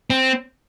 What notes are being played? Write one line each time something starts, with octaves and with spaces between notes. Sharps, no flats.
C4